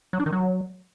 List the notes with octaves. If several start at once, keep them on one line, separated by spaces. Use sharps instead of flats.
F#3
D4
D#3
F#3